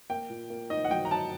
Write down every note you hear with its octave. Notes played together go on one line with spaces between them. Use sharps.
A#3 G5
A#2
A#3
D#4 D#5
F#5
F#3 G5
A#5
F#3 A5